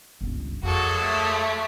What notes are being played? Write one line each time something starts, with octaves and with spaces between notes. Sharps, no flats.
G1 C#2
F2 F#3 G#3 A#3 F#4 A4
A3